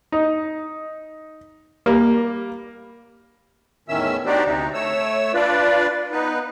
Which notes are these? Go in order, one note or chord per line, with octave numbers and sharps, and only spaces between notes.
D#4
G3 A#3
E2 A2 D#3 C#4 E5 E6
D4 D#4 F#4 G4 C5 D5
D2 C3 D#4
A3 C#5 E6
D4 F4 B4 D5
B3 D#4 B4